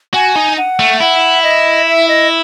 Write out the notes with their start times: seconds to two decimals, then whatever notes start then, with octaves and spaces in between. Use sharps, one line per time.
0.14 F#4 G#5
0.36 D#4
0.58 F#5
0.79 A3
1.00 E4 F#5
1.43 D#5
1.86 E5
2.08 D#5